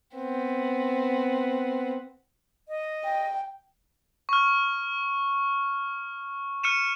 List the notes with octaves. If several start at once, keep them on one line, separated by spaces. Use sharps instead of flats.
B3 C4
D#5
G5
C#6 F6
F6 C#7 D#7 E7